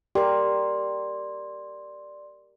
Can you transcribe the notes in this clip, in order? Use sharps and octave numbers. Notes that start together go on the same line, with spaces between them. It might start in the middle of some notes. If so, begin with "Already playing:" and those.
G4 A#4 D5 C6